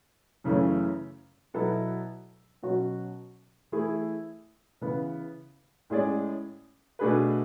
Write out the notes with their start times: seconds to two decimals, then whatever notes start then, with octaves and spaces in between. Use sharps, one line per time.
0.44 F#2 C#3 E3 A3 C#4
1.54 B2 F#3 B3 E4 A4
2.63 B2 F#3 C#4 F#4
3.72 E3 A3 E4 G#4
4.81 C#3 E3 B3
5.90 A2 G#3 C#4 G#4 D5
6.99 B2 A3 D4 G#4 B4